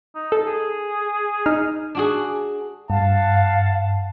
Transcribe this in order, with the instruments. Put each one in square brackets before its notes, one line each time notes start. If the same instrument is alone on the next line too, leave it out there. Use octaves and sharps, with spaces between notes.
[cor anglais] D#4
[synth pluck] A4
[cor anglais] G#4
[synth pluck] D#4 F6
[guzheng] D4 F#4 G#4
[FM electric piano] G2 [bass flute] F5 [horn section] F#5 A5